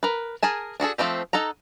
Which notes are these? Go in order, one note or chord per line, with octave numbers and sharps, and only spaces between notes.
A#4 B4
G#4 A#4 G#5 A5
D4 F#4 G#4 A4
F3 A3 C4 G4
D#4 A4 F#5 A#5